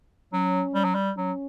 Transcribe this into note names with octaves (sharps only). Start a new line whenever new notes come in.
F#3 C#4
G3
F#3
G3
F#3 C#4